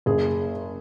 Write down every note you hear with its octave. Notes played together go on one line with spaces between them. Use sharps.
F#1 G#4